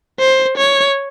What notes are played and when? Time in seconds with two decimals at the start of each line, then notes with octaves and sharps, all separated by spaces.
0.20 C5
0.57 C#5